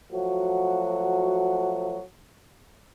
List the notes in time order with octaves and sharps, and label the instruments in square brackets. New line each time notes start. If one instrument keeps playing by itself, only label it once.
[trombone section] F3 F#3 A3 F#4